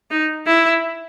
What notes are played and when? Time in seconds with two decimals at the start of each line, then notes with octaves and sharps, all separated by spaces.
0.10 D#4
0.46 E4